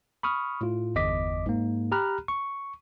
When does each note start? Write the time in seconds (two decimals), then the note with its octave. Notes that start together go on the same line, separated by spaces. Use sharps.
0.23 B5 C#6 D#6 F6
0.61 A2 F4
0.95 G1 E2 D#5 D6 B6
1.46 G#2 A#3
1.92 G4 A#5 B5 F6 F#6
2.28 C#6